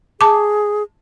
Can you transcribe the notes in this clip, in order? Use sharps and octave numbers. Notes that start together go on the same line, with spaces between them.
G#4 A5 D6